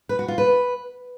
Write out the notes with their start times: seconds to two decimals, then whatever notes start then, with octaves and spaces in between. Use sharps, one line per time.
0.09 B4
0.19 F#4
0.28 F4
0.38 B4